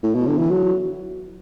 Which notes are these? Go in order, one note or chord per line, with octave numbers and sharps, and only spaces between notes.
A2
B2
D3
E3
F#3